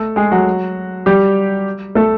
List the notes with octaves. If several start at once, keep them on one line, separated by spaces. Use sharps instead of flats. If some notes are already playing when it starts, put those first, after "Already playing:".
Already playing: A3 A4
G#3 G#4
F#3 F#4
G3 G4
A3 A4